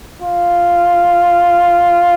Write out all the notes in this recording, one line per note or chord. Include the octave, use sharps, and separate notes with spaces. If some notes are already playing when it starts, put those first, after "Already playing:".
F4